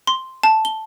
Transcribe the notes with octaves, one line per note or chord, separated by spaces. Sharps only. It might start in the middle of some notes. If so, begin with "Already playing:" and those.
C6
A5
G7